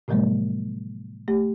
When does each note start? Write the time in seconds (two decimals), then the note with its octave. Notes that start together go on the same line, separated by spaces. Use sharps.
0.08 A2 C3 F3 F#3 G#3 A#3
1.28 A3 G4